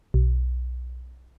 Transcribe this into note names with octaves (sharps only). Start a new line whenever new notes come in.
B1